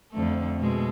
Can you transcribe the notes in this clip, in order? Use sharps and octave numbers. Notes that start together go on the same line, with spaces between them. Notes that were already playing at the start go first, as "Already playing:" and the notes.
F2 D3 A3
B2 G#3 A3